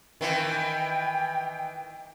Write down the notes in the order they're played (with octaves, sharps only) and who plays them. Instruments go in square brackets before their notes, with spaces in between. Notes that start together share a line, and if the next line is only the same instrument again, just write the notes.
[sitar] D#3 E3 [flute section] G5